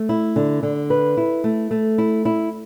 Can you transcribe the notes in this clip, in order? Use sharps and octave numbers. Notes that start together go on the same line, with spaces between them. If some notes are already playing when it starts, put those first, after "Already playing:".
Already playing: A3
E4
D3
D3
B4
E4
A3
A3
E4
E4